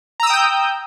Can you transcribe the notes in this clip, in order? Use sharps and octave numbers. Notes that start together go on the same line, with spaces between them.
G5 A#5 D#6 E6 G6